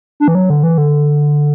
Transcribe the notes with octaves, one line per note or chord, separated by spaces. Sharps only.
D4
E3
F#3
D3
E3
D3